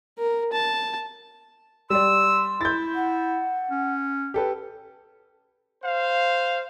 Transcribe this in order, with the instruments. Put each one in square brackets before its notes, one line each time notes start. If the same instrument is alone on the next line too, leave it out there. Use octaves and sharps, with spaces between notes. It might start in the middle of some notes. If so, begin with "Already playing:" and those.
[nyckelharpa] A#4
A5
[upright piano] G3 D5 [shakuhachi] C6 [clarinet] E6
[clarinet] E4 [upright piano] G6 A6
[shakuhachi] F#5
[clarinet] C#4
[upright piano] G4 A4 B4
[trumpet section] C5 F5